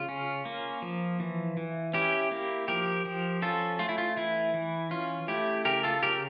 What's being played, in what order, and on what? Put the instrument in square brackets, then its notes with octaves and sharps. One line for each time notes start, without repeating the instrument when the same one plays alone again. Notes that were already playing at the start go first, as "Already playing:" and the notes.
Already playing: [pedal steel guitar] C#3 F4
C#4
A#3
F3
E3
E3
C#4 E4 G4
A#3
F3 G4 A#4
F3
C#4 F4 A4
A3 F4
E4
F4
E3 E4
E3
C#4 F4
A3 E4 G4
C#3 G4 A#4
F4 A4
C#3 G4 A#4